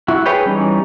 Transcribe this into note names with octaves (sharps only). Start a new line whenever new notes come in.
E4 F#4
G#4 B4 C#5 G5
E3 G3 C#4 D#4